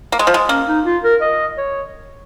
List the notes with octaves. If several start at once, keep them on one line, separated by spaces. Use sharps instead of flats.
A#3
G#3
F3
G#3
A#3 C#4
D#4
F4
A#4
D#5
C#5